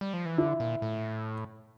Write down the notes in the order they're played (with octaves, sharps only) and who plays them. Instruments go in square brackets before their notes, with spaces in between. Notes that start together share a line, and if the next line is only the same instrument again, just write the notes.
[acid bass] G3
F3
E3
[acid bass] D3 [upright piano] E4
[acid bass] A#2
A2